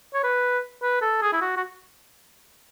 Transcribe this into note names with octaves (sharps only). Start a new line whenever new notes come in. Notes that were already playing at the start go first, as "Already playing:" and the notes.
C#5
B4
B4
A4
G#4
E4
F#4
F#4